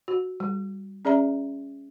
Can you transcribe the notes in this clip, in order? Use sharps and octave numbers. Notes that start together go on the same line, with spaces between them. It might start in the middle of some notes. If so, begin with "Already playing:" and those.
F#4
G3
C#4 G#4 D5 E5 A#5